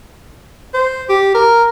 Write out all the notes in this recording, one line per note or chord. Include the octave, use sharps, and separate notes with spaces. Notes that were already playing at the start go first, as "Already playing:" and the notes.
C5
G4
A#4